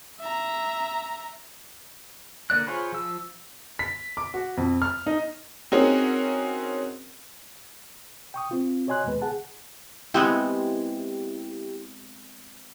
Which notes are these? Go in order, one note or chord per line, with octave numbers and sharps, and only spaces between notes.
E5 A#5
D3 A#3 D5 F#6
F4 G#4 C5 C#5 B5
F3 E6
B6
D6
F#4
F2
F6
D#4
C4 C#4 D#4 F#4 G#4 A#4
G5 C#6 D#6
C4 F4
F#4 C#5 D#5 G#5 C6 F#6
D#2 A2 G#3 B3 B4
G#4 F#5 A5
G#3 B3 C4 E4 G4